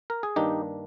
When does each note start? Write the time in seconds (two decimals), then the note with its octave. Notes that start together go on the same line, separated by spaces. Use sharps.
0.10 A#4
0.23 G#4
0.36 G2 D#3 A#3 D4 D#4 G4